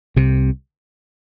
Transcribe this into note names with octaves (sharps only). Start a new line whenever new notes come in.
C2 C3